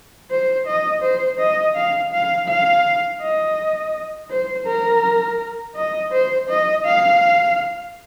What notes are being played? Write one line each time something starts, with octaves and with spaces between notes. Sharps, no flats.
C5
D#5
C5
D#5
F5
F5
F5
D#5
C5
A#4
D#5
C5
D#5
F5